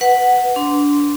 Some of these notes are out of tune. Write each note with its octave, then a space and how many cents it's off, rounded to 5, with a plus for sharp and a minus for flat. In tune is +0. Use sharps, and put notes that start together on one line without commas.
B4 +0 F#5 +0
D4 -20 C6 -10